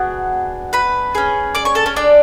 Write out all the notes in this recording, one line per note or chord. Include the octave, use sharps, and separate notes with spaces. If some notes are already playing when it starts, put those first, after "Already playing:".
Already playing: B3 D4 F#4 G#4 F#5
B4 B5
C#4 G#4
D5 D6
C#5 C#6
A4 A5
C#4 C#5
D4 D5